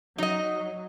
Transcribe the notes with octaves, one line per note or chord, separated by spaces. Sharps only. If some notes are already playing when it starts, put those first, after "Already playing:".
F#3 D#4 D#5